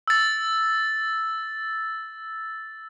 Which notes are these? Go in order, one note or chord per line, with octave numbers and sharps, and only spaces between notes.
E6 A6